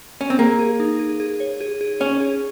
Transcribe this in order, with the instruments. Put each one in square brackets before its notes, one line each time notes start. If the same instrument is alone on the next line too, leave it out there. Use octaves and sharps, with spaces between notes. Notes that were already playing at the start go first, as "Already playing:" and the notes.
[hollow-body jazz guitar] C#4
C4
[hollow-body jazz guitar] A#3 [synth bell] G#4
[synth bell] G#4
D#4
G#4
G#4
C#5
G#4
G#4
[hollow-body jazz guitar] C#4 [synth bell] C#5
[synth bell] G#4